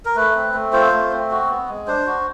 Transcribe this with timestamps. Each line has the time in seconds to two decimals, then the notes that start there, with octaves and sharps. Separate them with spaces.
0.05 A#4
0.16 A3 B4
0.35 C4
0.54 A3
0.73 F4 C5
0.92 A3
1.11 C4
1.31 F#4
1.50 B3
1.69 G#3
1.87 D4 C5
2.06 F#4